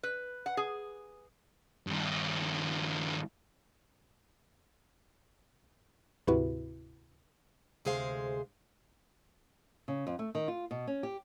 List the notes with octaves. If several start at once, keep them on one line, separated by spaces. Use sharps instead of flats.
B4
F#5
G#4
G2 D#3
D2 G#2 C3 E4 F#4 B4
D2 C3 G#3 G#4 C5 F5
C#3
F2
A3
D#3
F4
B2
C#4
G4